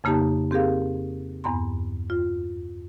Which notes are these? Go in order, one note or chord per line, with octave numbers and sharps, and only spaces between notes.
F2 C#3 A#3 D#4 G4 A5
C4 G4 G#4 A#4 F5
E2 G2 B3 A#5 C6
F4